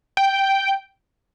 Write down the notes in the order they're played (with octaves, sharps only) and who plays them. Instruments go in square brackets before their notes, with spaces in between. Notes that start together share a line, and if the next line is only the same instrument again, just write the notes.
[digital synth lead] G5